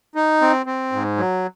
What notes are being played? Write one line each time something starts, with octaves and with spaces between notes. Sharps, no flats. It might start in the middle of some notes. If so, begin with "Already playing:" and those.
D#4
C4
C4
G#2
F#3